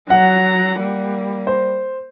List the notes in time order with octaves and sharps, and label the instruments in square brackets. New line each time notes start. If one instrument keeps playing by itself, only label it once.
[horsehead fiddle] F#3 A#5 [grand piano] F#5
[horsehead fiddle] G3 A#3
[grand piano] C5